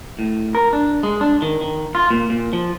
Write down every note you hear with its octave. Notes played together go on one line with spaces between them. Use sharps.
A2
A#4
D4
G#3
D4
D#3
D#3
F4
A#2
A#2
F3